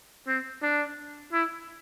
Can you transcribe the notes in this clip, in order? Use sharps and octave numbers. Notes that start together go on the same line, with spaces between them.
C4
D4
E4